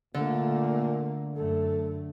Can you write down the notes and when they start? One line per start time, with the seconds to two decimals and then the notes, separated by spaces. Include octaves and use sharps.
0.14 A#2 D3 A3 A#3
1.36 F#2 A3 A4